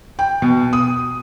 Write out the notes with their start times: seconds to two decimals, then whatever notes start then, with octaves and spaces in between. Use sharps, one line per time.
0.19 G5
0.42 B2
0.73 D#6